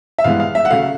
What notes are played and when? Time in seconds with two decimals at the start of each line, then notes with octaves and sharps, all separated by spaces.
0.18 E5
0.24 G2 E3 G#3 B3 F5
0.40 F5
0.55 E5
0.65 F#5
0.70 C#3 F#3 A3 F5